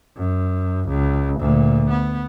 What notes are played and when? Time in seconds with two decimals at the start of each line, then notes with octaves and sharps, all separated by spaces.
0.17 F#2
0.89 C#2
1.40 D2 A#2
1.90 B3